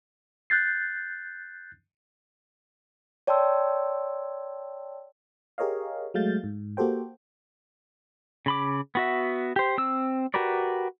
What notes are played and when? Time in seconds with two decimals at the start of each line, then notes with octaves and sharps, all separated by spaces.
0.50 F#6 G6 A6 C7
3.27 C#5 D5 G5 A5 C6 E6
5.58 G4 G#4 A#4 C#5 D#5 F5
6.14 F#3 G#3 A3 F5 G6 A6
6.44 G#2
6.77 A#3 F#4 G4 A4 C5 G5
8.46 C#3 B5 D6
8.95 B3 F#4 E5
9.56 G4 C5
9.78 C4 E6
10.34 F#4 G4 A#4 B4 D5